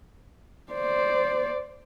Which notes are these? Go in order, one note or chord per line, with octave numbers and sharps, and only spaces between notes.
C5 D5